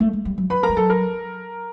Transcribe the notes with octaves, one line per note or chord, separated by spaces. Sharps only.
A3
G#3
G3
F#3
F3 B4 B5
A#4 A#5
G3
F#3 A4 A5
A#4 A#5